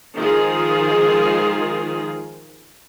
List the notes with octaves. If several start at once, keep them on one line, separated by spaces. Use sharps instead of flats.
D#3 F3 G#3 F4 G#4